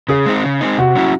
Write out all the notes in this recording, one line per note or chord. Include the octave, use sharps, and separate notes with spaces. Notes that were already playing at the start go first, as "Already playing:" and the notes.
C#3 G#4
G#3 C4 D#4
C#3
G#3 C4 D#4
C3 F#4
F#3 C#4 E4